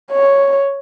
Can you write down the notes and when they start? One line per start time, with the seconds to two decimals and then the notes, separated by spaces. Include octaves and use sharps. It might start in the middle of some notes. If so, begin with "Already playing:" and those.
0.11 C#5